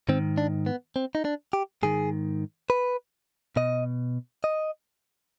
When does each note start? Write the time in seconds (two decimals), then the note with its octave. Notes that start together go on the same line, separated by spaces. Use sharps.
0.09 G#2 D#3 C4
0.38 D4
0.66 B3
0.96 C4
1.15 D#4
1.25 D4
1.53 G4
1.83 G#2 D#3 G#4
2.70 B4
3.56 B2 D#5
4.44 D#5